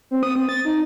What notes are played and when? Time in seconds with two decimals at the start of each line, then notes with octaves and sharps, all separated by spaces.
0.11 C4
0.23 D#6
0.36 C4
0.49 A6
0.65 D#4